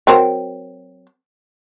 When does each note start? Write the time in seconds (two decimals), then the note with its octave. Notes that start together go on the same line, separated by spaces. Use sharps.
0.07 F#3 C4 A#4